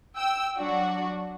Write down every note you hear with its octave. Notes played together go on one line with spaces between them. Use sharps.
G5 E6
F#3 D4 F#4